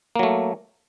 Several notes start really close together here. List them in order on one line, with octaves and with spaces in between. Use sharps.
A#3 F#3 A3